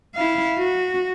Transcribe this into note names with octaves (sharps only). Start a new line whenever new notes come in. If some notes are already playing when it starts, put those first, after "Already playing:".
E4 F5
F#4